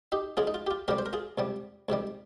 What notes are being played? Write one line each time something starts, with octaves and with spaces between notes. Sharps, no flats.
D#4 G4
C#2 C#3 G#3 F4 G#4
D#4
F4
G4
F4
C#2 C3 G3 G4 A#4
C5
A#4
F4 G#4
C#2 C3 G3
C#2 C3 D#3 G3